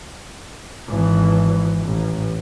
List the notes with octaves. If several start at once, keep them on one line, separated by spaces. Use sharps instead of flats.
G#1 E3
A1